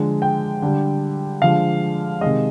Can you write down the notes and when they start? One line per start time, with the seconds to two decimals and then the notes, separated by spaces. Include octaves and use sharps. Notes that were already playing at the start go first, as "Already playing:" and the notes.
Already playing: D3 F3 G#3
0.22 G5
0.62 D3 G3
1.42 D3 F3 G#3 F5
2.21 C3 D#3 G#3 D#5